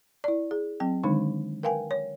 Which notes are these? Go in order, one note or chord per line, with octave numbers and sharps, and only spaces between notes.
E4 D5
G#4
F#3 C4 G5
D3 D#3 G#3 D4 D#4
A#4 B4 F5 G5 G#5
C#5